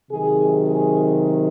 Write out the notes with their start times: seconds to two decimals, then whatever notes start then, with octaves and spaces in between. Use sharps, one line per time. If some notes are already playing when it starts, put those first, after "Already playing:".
0.11 C3 D#3 F#3 G#4
0.67 G#4